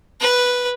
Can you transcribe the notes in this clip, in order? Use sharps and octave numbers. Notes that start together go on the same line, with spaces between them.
B4